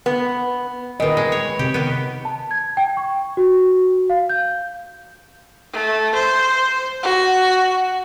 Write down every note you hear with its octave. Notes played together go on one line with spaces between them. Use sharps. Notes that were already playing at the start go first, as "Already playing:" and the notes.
B3
A#2 D#3 B4 D#5
G#3
C#5
C3 G4
D#3 B3
A5
G#6
G5
C#6
F#4
F5
G6
A3
C5
F#4